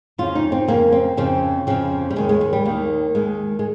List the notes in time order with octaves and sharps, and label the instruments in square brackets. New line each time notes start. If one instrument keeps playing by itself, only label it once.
[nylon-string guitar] F2 C#3 F3 F4
D#4
C4
F2 C#3 F3 A#3
C4
F2 C#3 F3 C4
F2 C#3 F3 C4
G3
D#2 D#3 G#3
G#3
G#3
G3
D#2 D#3 A#3
D#2 D#3 G#3
G#3